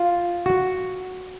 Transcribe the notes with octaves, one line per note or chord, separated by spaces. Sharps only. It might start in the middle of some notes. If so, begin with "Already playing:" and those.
Already playing: F4
F#4